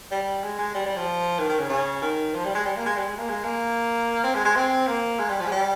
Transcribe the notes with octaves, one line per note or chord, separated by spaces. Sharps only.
G3
G#3
G#3
G3
G3
F3
D#3
D#3
C#3
C#3
D#3
F3
G3
G#3
G3
A#3
G#3
G3
G#3
A#3
G#3
A#3
C4
G#3
G#3
C4
A#3
G#3
G3
F3
G#3
G3